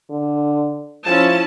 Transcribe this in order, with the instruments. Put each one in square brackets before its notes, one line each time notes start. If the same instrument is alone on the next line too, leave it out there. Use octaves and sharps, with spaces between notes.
[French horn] D3
[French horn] F3 [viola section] C#4 E4 A5